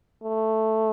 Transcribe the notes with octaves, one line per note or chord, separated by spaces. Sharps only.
A3